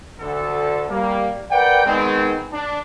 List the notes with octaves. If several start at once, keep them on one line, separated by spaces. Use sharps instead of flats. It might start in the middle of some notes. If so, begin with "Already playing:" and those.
D2 D3 A4
G3 A#3
A#4 B4 D5 F#5 G5
D#3 G#3 B3 C4
D4